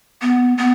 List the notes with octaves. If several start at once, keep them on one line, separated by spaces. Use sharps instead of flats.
B3
B3